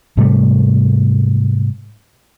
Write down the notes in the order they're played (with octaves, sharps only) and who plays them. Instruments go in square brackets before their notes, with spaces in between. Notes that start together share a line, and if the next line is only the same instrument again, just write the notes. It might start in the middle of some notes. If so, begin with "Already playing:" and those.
[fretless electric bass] G#2 C3 G3 A3